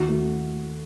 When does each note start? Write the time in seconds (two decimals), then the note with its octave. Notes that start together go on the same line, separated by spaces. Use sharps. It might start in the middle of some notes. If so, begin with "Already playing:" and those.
Already playing: D#2 F#4
0.09 A3